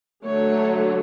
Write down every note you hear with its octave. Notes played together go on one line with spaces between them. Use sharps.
D3 F#3 A3 C#5